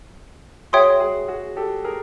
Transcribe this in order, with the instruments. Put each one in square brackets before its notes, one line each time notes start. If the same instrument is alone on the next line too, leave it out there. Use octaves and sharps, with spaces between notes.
[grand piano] F#4 G#4 [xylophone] C#5 E5 G5 C6 D#6
[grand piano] F#4 G#4
F#4 G#4
G4 A4
G#4 A#4